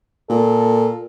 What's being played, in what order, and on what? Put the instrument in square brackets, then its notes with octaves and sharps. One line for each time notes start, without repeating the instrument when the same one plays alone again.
[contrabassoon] A#2 [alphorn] A4